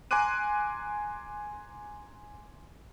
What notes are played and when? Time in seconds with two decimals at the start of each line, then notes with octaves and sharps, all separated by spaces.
0.11 G#5 A#5 C6 D6 F#6 D#7